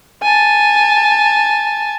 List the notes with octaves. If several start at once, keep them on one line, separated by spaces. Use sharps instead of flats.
G#5 A5